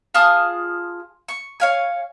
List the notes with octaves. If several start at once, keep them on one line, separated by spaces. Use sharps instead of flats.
F4 G#4 A5 D#6
C#6
C#5 F5 G#5